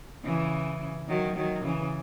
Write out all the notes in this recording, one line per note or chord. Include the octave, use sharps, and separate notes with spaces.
C#3 E3
D#3 F#3
D#3 F#3
C#3 E3